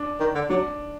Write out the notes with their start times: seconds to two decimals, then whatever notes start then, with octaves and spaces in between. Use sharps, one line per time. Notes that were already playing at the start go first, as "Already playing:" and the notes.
Already playing: D4
0.20 D#3
0.35 D3
0.50 F#3 D4